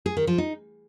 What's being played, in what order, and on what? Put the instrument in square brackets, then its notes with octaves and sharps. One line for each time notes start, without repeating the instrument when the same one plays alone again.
[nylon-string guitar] G#4
D#3
F3
D#4